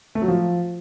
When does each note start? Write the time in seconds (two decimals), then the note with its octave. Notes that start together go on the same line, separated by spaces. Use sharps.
0.15 A3
0.22 F#3
0.28 F3